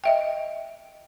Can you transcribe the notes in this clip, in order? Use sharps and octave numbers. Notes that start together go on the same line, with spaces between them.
D#5 E5 G5